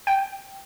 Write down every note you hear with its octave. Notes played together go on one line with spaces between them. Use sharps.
G5